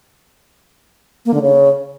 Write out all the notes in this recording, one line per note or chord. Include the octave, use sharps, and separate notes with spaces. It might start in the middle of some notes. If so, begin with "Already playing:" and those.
A#3
D3
C#3